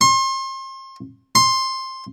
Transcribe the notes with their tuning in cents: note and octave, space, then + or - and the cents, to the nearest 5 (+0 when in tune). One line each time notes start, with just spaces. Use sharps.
C6 +35
C6 +10